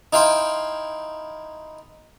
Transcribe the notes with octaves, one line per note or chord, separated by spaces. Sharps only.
D#4 E4 F5 G5 C6